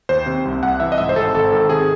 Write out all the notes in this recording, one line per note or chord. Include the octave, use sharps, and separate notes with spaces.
D#2 C5
C3
C2
C2 F#5
E3 E5
D#5
G#2 E5
C5
G#1 A4
G#1 A4
D#3 A4
C3 G#4